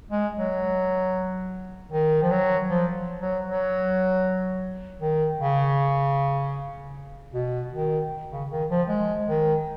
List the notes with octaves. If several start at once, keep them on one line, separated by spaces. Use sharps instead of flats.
G#3
F#3
D#3
F3
F#3
F3
F#3
F#3
D#3
C#3
B2
D#3
C#3
D#3
F3
G#3
D#3